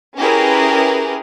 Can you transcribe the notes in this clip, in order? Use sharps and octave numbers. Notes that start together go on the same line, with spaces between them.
C#4 E4 G4 G#4 A#4 B4